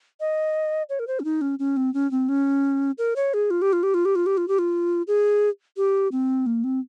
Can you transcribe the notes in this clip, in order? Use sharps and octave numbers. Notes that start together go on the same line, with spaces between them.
D#5
C#5
A#4
C5
C#4
D#4
C#4
C#4
C4
C#4
C4
C#4
A#4
C#5
G#4
F4
G4
F4
G4
F4
G4
F4
G4
F4
G4
F4
G#4
G4
C4
A#3
C4